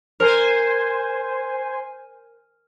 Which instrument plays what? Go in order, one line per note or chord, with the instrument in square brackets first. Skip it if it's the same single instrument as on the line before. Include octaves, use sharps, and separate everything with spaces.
[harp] A#4 [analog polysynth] C5 G#5